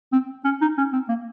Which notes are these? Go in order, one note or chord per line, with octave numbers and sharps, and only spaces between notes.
C4
C#4
D#4
C#4
C4
A#3